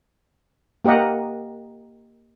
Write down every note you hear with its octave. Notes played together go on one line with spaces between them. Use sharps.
A#3 G4 A#4 D#5 F#5